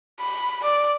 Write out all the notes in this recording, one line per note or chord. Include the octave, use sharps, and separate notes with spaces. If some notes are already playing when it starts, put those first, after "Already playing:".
B5
D5